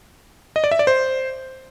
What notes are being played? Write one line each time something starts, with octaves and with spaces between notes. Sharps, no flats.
D#5
D5
E5
D5
C5